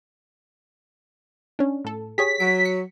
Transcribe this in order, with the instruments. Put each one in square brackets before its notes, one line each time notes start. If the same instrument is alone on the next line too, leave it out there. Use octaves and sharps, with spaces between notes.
[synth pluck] C#4 D4
A2 A4
[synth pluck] G4 G#4 C#5 [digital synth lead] B6
[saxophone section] F#3 [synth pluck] D7
[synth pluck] C#7